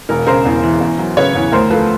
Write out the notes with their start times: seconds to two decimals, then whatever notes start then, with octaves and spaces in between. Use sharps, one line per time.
0.09 E1 A#4
0.27 C#3 A#4 C5
0.45 E2
0.64 E3
0.80 E2
0.98 F#3
1.17 C#3 B4 C#5
1.35 E2
1.52 D2 A#4 C5
1.70 F3 A4 B4